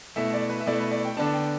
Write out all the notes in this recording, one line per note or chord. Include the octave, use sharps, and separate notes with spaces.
B2 A3 E4 E5
D5
B4
E5
B2 A3 E4 D5
B4
D5
G5
D3 B3 D4 A5
G5